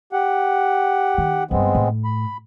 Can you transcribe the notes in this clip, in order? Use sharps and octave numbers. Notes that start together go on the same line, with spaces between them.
G4 F#5
D#3
G1 D#3 G#3 B3 C4
A2
B5